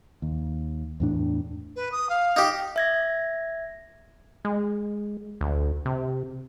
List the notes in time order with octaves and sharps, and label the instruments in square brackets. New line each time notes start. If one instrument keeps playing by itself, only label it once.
[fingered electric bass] D#2
E2 A2 D4
[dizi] B4
D#6
F5
[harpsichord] D#4 G4
[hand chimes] E5 G#6 A#6
[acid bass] G#3
D2
C3